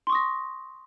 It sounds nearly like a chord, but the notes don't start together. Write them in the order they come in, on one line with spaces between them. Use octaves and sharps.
C6 C#6 D#6 A#6